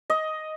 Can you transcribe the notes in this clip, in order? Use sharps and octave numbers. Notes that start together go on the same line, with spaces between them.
D#5